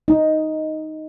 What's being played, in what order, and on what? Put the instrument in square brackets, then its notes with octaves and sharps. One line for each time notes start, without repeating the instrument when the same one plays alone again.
[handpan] D#4